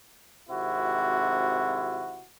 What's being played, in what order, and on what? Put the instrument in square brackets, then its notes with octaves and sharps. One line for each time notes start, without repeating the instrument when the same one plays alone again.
[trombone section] G#1 C3 E4 F#4